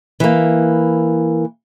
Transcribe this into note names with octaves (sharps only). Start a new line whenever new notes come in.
E3 A#3